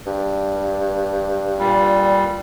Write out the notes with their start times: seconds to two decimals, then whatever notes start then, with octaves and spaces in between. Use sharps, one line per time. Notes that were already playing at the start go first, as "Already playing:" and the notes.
0.06 G2
1.59 A#2 G3